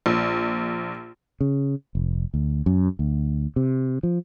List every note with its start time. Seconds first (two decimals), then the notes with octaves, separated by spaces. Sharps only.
0.06 A#1
1.41 C#3
1.95 F1
2.34 D2
2.66 F#2
2.99 D2
3.56 C3
4.03 F3